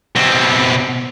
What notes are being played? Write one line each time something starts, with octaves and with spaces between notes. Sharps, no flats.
B2 C4